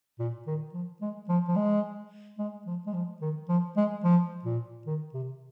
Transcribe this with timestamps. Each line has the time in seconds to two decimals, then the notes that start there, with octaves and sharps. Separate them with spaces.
0.19 A#2
0.47 D#3
0.74 F3
1.02 G#3
1.29 F3
1.48 F3
1.56 G#3
2.39 G#3
2.66 F3
2.86 G#3
2.94 F3
3.21 D#3
3.49 F3
3.77 G#3
4.04 F3
4.45 A#2
4.86 D#3
5.14 C3